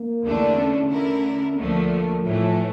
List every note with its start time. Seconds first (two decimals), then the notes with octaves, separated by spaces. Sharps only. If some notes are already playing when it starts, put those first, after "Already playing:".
Already playing: A#3
0.24 E2 D3 A3 D4
0.57 C#4
0.90 D3 A3 E4 A#4
1.57 D2 D3 F3 A3 A#3
2.23 A2 E3 F3 A3